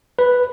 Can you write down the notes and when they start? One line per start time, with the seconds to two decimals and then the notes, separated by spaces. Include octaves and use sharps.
0.19 B4